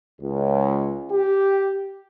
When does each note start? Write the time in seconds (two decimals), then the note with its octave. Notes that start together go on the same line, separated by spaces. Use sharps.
0.22 C#2
1.12 G4